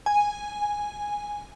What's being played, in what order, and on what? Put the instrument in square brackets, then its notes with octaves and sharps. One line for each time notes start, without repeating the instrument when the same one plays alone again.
[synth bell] G#5